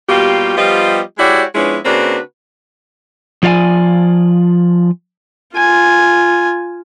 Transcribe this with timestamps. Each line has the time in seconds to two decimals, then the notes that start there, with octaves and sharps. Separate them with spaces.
0.08 B2 G3 A#3 F4 G4
0.56 F3 G3 B3 F4 G4 D#5
1.18 G#3 E4 F#4 G4 C#5 D5
1.55 F3 G#3 B3 C#4 D4 E4
1.85 C#3 A#3 C4 D4 F#4 B4
3.43 F3 F4 D5 F5 G#5
5.55 F4 G#5